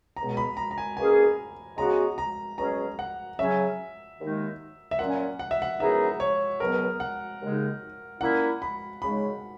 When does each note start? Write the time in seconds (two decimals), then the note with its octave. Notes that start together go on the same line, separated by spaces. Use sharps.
0.16 C#2 B2 G#3 B3 A#5
0.37 B5
0.57 A#5
0.71 A#5
0.78 G#5
0.97 B2 A#3 C#4 G#4 G#5
1.77 C#3 G#3 B3 F#4 A#5
2.18 A#5
2.57 B2 F#3 C#4 G#4 A#5
2.99 F#5
3.38 C#3 F#3 C#4 E5
4.19 D#2 D#3 G#3 D#4
4.91 E5
4.99 A#2 F#3 C#4 F#5
5.39 F#5
5.51 E5
5.62 F#5
5.80 F#2 E3 B3 D#4 G#4 E5
6.20 C#5
6.60 C#2 B2 F#3 B3 A#4
7.00 F#5
7.41 D#2 C#3 G#3 D#4
8.21 A#2 A#3 C#4 E4 F#5
8.62 B5
9.02 C#3 G#3 D#4 B5